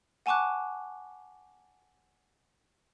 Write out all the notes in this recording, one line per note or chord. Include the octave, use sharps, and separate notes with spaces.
F#5 G#5 A5 C#6 D6 F#6